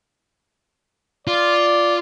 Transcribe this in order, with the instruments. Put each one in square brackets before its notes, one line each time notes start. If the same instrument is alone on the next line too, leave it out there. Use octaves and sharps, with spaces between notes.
[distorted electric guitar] F4 [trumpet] D5